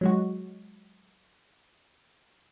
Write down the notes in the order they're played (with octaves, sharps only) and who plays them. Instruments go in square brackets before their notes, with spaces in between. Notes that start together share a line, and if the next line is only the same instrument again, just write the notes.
[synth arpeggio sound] F#3 G#3 F#4